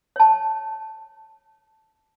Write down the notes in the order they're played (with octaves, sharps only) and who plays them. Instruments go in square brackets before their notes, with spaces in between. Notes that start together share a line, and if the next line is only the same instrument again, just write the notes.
[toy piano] C#5 A5